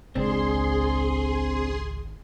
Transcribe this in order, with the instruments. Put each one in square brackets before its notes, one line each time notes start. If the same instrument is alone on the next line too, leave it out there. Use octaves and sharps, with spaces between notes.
[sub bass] G#1 [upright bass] C#2 [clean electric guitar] C4 D4 [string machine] G#4 C6